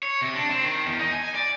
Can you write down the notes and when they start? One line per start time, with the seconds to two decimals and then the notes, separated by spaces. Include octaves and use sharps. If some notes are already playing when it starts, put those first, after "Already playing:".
0.03 C#5
0.22 C3
0.35 D4
0.50 C4
0.63 D#3
0.86 E2
1.00 D#4
1.12 G#5
1.35 D5